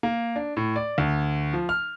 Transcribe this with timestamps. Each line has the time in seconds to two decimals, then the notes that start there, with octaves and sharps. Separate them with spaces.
0.03 A#3
0.36 D4
0.57 A2
0.76 D5
0.98 D2
1.53 F3
1.69 F6